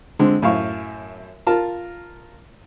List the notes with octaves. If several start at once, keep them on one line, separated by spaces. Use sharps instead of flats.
D3 G#3 C4
F#2 A2 F5 C#6
F4 A#4 A5